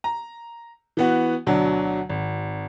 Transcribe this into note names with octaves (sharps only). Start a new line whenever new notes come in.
A#5
E3 B3 F#4
D2 B2 D3 F#3 D4
G#1